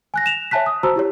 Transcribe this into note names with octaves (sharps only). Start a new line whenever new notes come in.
G#5 F#6 A#6
E7 F7
C#5 E5 G#5 A5 F#6 B6
D#6
F#4 C5 A5 A#5 E6
E4 G4 C#5